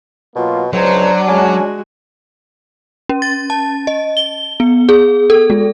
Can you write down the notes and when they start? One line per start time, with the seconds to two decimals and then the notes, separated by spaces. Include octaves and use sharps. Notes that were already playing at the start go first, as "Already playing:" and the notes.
0.36 B2 F#3 A#3 F4
0.73 C#2 F#3 D4 C5
1.28 G#3 C#4 F#4
3.09 C#4
3.22 A6
3.50 A5
3.87 D#5
4.17 G7
4.60 B3
4.89 G#4
5.30 A4
5.50 G#3